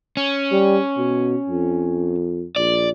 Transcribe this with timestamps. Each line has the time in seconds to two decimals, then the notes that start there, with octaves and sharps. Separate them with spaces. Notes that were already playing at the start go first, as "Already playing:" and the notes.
0.17 C#4
0.52 G3
0.97 B2
1.49 F2
2.56 A#1 D5